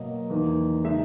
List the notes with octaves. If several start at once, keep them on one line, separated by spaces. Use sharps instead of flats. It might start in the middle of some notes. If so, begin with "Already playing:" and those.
Already playing: B2 F#3 A#3 D#5
E2 D#3 F#3 A#3 D#4
C#3 G#3 D#4 E5